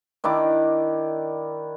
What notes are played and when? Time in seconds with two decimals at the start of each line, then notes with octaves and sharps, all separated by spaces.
0.24 D#3 D4 E4 D6